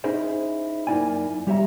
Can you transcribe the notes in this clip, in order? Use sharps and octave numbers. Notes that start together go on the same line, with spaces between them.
C#4 D#4 E4 G#4 C5 D#5
F#2 A#3 D#4 E4 D5 G#5
G3 G4 C#5 E5 A#5